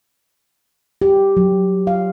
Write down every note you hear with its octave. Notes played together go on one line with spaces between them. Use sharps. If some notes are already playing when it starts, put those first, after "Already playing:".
G4
F#3
F5